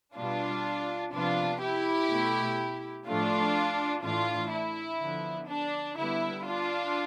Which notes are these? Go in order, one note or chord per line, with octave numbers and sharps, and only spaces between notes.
B2 G3 B3 D4 F4
C3 F3 B3 D4 F4
E4 G4
B2 A3
A2 F3 A3 D4 F4
A2 E3 A3 D4 F4
E4
D3 F3 B3
D4
D3 G3 B3 E4
D4 F4